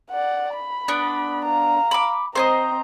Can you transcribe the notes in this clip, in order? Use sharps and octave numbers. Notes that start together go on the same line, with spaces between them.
D5 F#5
B5
B3 D4
F5 A#5
B5 D6
C4 C5 C#5 D#5 A#5